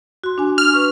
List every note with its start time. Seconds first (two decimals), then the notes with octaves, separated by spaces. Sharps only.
0.24 F#4 C6
0.38 D4 G#5
0.58 F6
0.74 B4 C#6